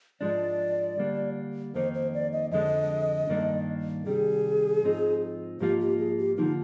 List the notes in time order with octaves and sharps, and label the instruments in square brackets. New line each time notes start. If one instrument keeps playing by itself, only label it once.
[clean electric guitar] G#2 F3 G#3 D4 [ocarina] D5
[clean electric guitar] D3 G3 A#3 D4
[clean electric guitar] F2 D#3 A#3 D#4 [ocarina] C5
[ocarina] C5
D5
D#5
[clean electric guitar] F2 D3 G#3 D4 [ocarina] D#5
[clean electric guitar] G2 D#3 A#3 D4
[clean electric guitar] C3 D#3 G3 [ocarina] G#4
[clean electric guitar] G#2 F3 C4 D#4
[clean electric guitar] G#2 F3 A#3 F4 [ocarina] G4
[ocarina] G4
G#4
G4
[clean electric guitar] D3 F3 A#3 [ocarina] D#4